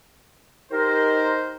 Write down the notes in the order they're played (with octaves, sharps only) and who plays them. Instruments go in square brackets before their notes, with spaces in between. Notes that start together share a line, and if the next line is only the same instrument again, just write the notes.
[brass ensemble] D#4 C5 [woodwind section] G4 A#4